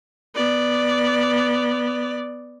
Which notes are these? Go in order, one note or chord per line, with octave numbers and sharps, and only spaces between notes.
B3 D5